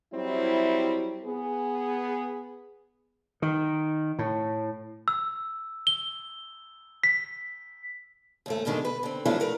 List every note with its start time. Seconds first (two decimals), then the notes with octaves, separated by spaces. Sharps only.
0.13 F#3 G3 C4 E4
1.25 B3 G#4
3.42 D#3
4.19 A2
5.08 E6
5.87 G7
7.04 B6
8.46 D#2 G#2 A3
8.65 G2 B2 D3 D#3 G#3
8.85 B4
9.03 D3 C4
9.25 F3 F#3 A3 B3 D4 E4
9.40 A3 A#4 B4